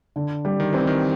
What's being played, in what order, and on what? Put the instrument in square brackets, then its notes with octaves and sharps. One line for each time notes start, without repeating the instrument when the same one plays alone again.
[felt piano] D3
G3
[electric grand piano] D#3
[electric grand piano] E3 [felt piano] C4
[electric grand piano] D#3